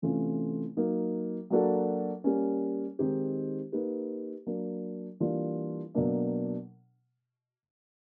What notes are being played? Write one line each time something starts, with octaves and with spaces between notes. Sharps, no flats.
C3 E3 A3 C#4 F4
F#3 A#3 D#4
F#3 A#3 D4 F#4 A4
G3 A#3 C#4
D#3 G#3 C4 D#4 G4
A#3 D#4 G4 B4
F#3 A#3 D4
E3 G3 A#3 D4 F4
B2 F#3 A#3 D4